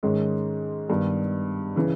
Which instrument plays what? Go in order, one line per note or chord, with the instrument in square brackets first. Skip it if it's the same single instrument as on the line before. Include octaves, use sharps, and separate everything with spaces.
[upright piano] G#2 D#3 G#3 C#4
G2 D#3 G3 B3
C#3 E3